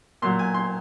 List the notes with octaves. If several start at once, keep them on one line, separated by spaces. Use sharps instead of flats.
A#2 F#3 C6
G#5
C6